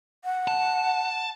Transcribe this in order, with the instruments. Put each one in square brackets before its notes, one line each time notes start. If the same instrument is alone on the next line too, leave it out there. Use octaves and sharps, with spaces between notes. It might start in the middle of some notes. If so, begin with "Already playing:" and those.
[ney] F#5
[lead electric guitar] A5